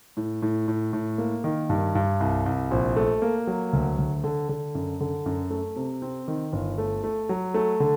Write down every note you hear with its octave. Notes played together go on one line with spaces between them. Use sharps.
A2
A2
A2
A2
A#3
D#3
G2
G2
C2
C2
A#1
A3
A#3
F#3
D2
D2
D3
D3
F#2
D3
F#2
A3
C3
C4
D#3
G1
A3
A3
F#3
A3
D3